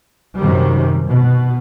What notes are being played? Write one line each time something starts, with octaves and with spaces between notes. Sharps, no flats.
F#2 C3 D#3 G3
B2